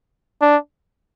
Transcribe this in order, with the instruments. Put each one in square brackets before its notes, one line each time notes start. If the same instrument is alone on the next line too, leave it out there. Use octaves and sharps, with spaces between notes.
[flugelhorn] D4